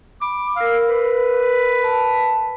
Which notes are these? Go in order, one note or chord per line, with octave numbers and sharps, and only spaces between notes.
B5 D6
A#4 F5 E6
B4
A5